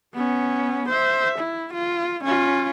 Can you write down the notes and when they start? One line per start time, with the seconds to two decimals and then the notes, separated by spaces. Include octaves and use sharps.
0.14 B3 C#4
0.89 C5 E5
1.39 E4
1.74 F4
2.24 C#4 F4